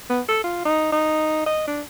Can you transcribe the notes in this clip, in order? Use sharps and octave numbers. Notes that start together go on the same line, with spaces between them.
B3
A4
F4
D#4
D#4
D#5
D4